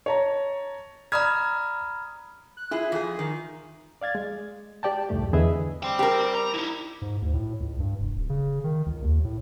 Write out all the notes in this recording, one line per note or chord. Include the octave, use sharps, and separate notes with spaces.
C#5 A5 A#5
D5 A#5 B5 D#6 F6 G#6
F#6
E4 F4 G#4
F2 G#4
D#3
D5 F5 G#6 A6
G#3
G4 D5 G5 A5
C2 F2 G#2 A3 G4
E2 D3 G#4 B4 D#5 E5
G3 C5 G5
G4 A#4
A#5
D#4 E4
G#2
D2
A2
C#2
G2
F1
D1
C#3
D#3
C#2
D#2
A2